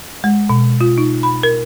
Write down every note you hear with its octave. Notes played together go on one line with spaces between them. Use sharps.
G#3
B2
F4
D#4
B5
A#4